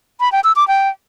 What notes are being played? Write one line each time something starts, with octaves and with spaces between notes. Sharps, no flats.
B5
G5
E6
D6
G5